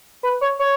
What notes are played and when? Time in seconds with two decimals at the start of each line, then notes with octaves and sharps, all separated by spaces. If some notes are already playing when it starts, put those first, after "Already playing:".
0.23 B4
0.41 C#5
0.59 C#5